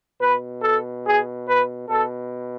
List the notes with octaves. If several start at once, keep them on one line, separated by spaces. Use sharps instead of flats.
B2 B4
A4
G#4
B4
B2 A4